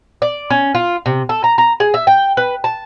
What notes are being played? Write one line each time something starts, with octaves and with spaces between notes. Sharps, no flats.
D5
C#4
F4
C3
A4
A#5
A#5
G#4
E5
G5
B4
A5